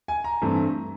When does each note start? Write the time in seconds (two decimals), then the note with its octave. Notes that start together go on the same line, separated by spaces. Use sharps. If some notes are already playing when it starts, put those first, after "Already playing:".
0.08 G#5
0.24 A#5
0.42 G2 E3 A3 C4